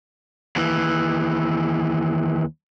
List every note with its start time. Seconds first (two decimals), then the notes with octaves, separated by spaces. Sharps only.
0.56 D#2 E3